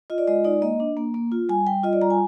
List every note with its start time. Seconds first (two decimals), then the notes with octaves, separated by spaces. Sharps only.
0.10 F4 D#5
0.18 D5
0.27 G#3 D#5
0.44 D#4 D5
0.62 A#3 D#5
0.80 D4
0.97 A#3
1.14 A#3
1.32 F4
1.49 G3 G#5
1.67 G3 G5
1.83 F4 D#5
1.93 D5
2.02 G3 A#5
2.10 G#5